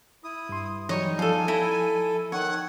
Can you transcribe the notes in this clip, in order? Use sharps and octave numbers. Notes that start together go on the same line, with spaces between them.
E4 D#6
G2 C6
E3 F#3 G3 D#4 C#5 D#5
F3 A4 F5 G#5 A5
E4 A4 A#5
D#3 C#5 F#5